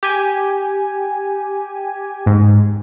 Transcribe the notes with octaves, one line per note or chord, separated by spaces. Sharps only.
G4 G#5
G#2